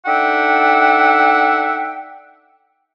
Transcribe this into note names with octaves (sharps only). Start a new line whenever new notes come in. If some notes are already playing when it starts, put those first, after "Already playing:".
D4 D#4 A4 E5 F#5 G5